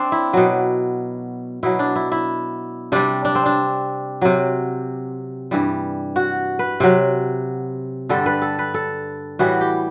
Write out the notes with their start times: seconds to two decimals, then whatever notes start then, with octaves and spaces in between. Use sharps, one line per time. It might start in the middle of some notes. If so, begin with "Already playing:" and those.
Already playing: C4 D4
0.12 E4
0.33 B2 F#3
1.63 B2 F#3 E4
1.79 D4
1.96 E4
2.12 E4
2.92 C3 G3 D4
3.25 D4
3.35 C4
3.46 D4
4.22 C3 F#3
5.51 G2 E3 G3
6.16 F#4
6.59 B4
6.80 C3 F#3
8.09 G2 D3 G3 A4
8.26 B4
8.42 A4
8.59 B4
8.74 A4
9.39 A2 E3 G3 F#4
9.61 G4